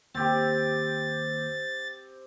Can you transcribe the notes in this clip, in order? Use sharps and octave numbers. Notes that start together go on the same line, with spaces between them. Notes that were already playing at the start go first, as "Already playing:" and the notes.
D#2 C4 G4 A6